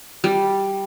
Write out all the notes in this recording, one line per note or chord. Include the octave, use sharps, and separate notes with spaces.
G3